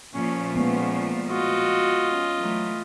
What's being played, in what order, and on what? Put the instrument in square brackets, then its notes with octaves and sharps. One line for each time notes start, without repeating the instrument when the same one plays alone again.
[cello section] A#2 F3 A3 [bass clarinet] C#4
[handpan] G#3 B3 [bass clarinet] C#4
[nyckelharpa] F4 D#5 [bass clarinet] F#4
[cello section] C#4
[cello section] E3 A3 [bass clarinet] F#3